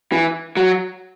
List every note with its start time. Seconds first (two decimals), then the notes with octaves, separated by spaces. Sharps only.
0.12 E3
0.57 F#3